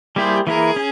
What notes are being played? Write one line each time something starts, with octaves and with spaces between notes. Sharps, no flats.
G3 A#3 E4 G4 G#4 C5
E3 A#3 E4 G#4 A#4
C#4